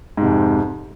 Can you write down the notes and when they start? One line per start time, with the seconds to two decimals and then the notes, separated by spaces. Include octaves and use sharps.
0.17 G#2
0.21 C3
0.25 F2